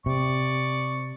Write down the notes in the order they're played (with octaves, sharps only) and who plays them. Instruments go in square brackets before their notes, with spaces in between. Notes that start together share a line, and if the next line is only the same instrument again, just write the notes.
[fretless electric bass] C3 [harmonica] D5 C#6